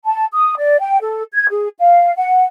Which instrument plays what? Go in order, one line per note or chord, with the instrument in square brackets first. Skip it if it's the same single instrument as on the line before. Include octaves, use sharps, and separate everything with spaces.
[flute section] A5
D#6
D5
G5
A4
G#6
G#4
F5
F#5